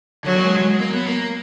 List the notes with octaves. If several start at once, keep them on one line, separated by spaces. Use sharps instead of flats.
D3 F#3
A#3
G#3
G#3
A#3
B3
A#3